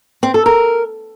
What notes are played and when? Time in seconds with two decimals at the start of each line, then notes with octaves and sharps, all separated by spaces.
0.23 C4
0.34 A4
0.46 A#4